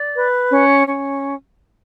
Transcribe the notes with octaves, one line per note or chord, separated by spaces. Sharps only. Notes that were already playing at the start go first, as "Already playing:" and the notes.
Already playing: D5
B4
C#4
C#4